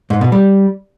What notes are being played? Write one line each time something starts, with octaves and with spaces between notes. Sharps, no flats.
G#2
B2
G3